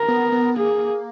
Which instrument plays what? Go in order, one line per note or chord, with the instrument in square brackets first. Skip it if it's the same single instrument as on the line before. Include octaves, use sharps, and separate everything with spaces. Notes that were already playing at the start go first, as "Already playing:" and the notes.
Already playing: [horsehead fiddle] A#4
[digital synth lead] B3
B3
[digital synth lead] A#3 [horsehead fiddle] G#4